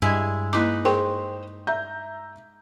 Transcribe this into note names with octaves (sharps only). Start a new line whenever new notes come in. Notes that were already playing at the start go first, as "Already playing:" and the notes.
G2 G#3 E4 G#5
A#3 D#4 E4 B4 D6
G#4 C5 G5 C#6
E5 A#5 G6